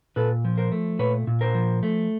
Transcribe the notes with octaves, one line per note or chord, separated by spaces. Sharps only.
A#2 A4 B4
F3
A#4 C5
A3
A#2 B4 C#5
A#2
A#4 C5
F3
A3